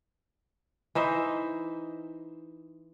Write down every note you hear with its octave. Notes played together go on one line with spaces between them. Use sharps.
E3 D#4 C5 E5